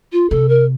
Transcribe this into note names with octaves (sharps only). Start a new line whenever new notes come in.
F4
C3 A4
A#4